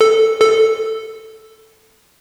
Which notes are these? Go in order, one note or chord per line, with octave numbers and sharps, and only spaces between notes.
A4
A4